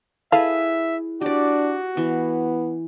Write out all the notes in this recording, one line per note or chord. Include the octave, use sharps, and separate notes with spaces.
E4 G#4 A4 B4 E5 F5
D4 F#4 G4 D5
E3 B3